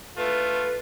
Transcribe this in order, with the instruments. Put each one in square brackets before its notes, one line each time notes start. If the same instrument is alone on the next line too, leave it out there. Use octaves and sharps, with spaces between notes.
[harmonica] A3 F4 [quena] B4